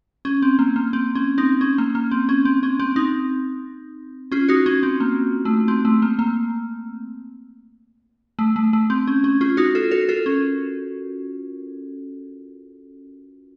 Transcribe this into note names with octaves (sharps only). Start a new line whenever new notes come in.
C#4
C4
A#3
A#3
C4
C#4
C4 D#4
C#4
A#3
A#3
C4
C#4
C4
C#4
C4
C4 D#4
C#4 F4
D#4 F#4
C#4
C4
A#3
A3
C4
A3
A#3
A#3
A3
A3
A3
C4
C#4
C#4
C#4 F4
D#4 F#4
F4 A4
F#4 A#4
F4 A4
C#4